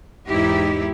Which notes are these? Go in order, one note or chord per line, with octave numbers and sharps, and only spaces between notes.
E2 G#2 D#4 E4 G4